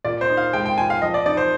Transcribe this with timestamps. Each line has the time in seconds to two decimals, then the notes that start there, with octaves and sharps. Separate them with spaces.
0.05 A#2 D5
0.21 C5
0.29 D#4
0.37 F5
0.53 G#3 G5
0.66 G5
0.77 A#2 G#5
0.90 F5
1.02 F3 D#5
1.14 D5
1.26 D#4 D5
1.37 C5